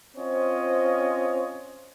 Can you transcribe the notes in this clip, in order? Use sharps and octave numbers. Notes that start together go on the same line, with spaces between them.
C4 C#4 F4 C5 C#5 D#5